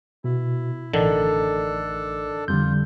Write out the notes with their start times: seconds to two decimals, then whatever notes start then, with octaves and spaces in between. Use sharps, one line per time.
0.24 B2 E4
0.94 A1 D3 D#3 D4 A4
2.48 F2 D3 G3 F4 G6